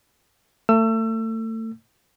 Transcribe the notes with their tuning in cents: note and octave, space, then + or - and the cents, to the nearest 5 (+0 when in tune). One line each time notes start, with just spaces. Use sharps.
A3 +30 E6 +30